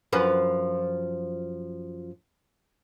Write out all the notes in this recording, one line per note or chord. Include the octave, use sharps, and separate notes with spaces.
F#2 F3 B4